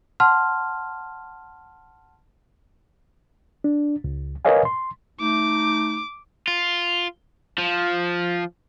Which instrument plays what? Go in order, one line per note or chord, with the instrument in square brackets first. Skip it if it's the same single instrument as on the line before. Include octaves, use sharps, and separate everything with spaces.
[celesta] F#5 A5 C6 F6
[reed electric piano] D4
C#2
A#4 B4 C#5 D#5 F5 G#5
C6
[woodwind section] A3 D#4 [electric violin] D6
[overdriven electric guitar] F4
F3